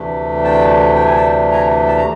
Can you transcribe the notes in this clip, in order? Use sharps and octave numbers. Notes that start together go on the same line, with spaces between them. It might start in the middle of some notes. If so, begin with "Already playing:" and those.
Already playing: D2 C3 E3 A3 D4
G5 A5
G5
G#5
G5 A5
G#5 A#5
A5
A#5